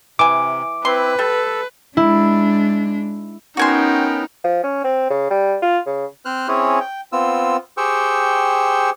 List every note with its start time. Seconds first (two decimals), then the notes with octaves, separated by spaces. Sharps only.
0.19 C3 E3 G#5 D6
0.85 C4 E4 B4 C6
1.19 G3 A4
1.97 G#3 D4 E4
3.57 B3 C#4 D#4 F#4 A#4 G5 G#5 C6
4.44 F3
4.64 C#4
4.84 C4
5.10 C#3
5.31 G3
5.62 F4
5.86 C#3
6.25 C4 C5 F6 F#6
6.48 C4 C#4 E4 G#4 C#5
6.80 G5
7.12 B3 C4 F4 E6
7.77 G4 G#4 C5 G5 C#6 E6